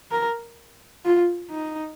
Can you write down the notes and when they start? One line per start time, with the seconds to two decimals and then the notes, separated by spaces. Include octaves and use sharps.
0.11 A#4
1.05 F4
1.50 D#4